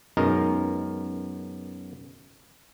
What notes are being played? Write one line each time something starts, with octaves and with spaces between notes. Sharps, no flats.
F#2 B2 G#3 D#4 A#4